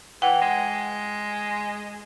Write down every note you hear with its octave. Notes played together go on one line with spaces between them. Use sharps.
E3 F#5 G5
G#3